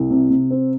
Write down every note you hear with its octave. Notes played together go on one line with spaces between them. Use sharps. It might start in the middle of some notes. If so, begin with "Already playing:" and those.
Already playing: C2
C3
C3
C4